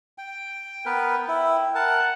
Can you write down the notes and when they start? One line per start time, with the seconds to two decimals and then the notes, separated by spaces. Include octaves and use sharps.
0.18 G5
0.86 B3 A#4 B4 G5
1.28 E4
1.75 A#4 F#5 A5